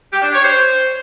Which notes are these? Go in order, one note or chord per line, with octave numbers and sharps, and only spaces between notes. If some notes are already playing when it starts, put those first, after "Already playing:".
G4
D4
C#5
C5